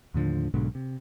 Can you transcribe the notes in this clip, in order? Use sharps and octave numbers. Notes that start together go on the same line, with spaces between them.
D#2 A2 D3 F3
B1 G#2 B2 D3
C3